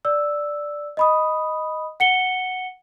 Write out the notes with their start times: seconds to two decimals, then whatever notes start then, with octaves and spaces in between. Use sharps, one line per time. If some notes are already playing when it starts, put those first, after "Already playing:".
0.05 D5 E6
0.97 D#5 B5 D#6
2.00 F#5 C#7 G7